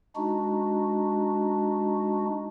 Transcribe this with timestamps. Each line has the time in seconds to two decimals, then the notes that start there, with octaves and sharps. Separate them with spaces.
0.16 G#3 D4 D#4 F#4